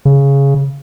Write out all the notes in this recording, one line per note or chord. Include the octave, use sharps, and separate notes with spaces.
C#3